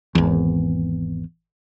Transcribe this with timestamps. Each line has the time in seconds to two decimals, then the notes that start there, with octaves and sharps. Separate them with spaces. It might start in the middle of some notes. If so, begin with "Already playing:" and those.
0.15 G#1 E2